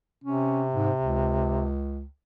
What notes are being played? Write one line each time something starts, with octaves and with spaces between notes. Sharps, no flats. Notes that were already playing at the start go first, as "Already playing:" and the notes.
C3 C#4
G#2
C#2